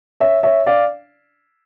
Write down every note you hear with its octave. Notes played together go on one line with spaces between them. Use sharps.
C#5 E5
C#5 E5
D5 F5